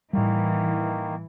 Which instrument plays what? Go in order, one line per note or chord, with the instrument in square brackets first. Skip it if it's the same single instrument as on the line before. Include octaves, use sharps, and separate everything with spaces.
[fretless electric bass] A2 G3 [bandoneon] D#3 A#3 [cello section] E3